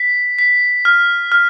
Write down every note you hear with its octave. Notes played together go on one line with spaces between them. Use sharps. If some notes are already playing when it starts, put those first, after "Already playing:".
Already playing: B6
B6
F6
F6